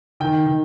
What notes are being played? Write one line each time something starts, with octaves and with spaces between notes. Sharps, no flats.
D#3 G5
D#3